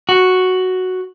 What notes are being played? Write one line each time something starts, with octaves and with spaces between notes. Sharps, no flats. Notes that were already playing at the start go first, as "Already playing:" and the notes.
F#4